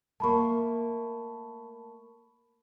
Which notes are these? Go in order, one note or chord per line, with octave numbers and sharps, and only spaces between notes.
A3 A#3 A5 B5 C#6